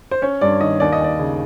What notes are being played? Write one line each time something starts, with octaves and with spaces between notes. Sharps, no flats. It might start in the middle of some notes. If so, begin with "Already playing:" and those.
C5
C#4 C#5
G2 D5
D#3 D#5
D#2 D5
D#5
D#2 D5
C#3